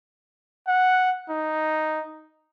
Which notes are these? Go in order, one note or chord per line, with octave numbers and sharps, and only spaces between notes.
F#5
D#4